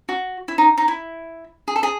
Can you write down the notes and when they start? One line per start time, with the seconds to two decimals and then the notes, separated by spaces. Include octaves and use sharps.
0.09 F#4
0.48 E4
0.58 D#4
0.78 D#4
0.88 E4
1.68 G#4
1.76 A4
1.83 G#4